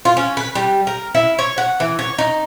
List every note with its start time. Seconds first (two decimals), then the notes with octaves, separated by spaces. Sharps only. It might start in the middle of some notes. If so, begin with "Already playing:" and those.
0.05 F4
0.17 C#4
0.37 B4
0.55 G3
0.87 A#4
1.15 E4
1.39 C#5
1.58 F#5
1.80 E3
1.99 C#5
2.18 D#4